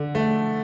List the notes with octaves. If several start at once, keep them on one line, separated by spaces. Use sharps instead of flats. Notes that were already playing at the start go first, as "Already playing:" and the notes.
Already playing: D3
A3